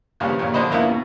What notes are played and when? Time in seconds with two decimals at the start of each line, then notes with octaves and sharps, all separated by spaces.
0.20 D#2 C#3 F3 G3 B3
0.39 D#2 A#2 C#3
0.54 D3 F3 C5 D#5 B5
0.70 C#2 A#2 A#3 B3 E4
0.89 B2